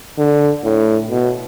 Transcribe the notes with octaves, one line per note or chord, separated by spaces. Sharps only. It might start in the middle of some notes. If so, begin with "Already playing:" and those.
D3
A2
B2